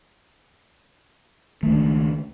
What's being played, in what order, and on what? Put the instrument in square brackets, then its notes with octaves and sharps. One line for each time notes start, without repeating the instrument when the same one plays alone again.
[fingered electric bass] C#2 A3 [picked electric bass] D#3 G#3 D4